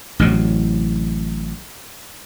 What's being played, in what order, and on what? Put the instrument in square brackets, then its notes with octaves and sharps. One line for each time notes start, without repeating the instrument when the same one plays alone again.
[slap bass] A1 A2 C3 F#3